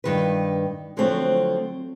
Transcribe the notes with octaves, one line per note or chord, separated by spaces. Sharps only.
G2 D#3 B4
D3 F3 F#3 A3 C4